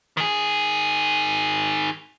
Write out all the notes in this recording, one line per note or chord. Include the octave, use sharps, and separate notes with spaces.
D#3 G#4